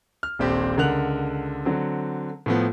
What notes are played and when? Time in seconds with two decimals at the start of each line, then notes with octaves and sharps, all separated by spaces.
0.23 F6
0.39 D#1 A#1 C4 G4
0.78 C#2 D3 A#4 F#5 F#6 F7
1.65 D3 F#3 C4
2.46 A2 F3 B3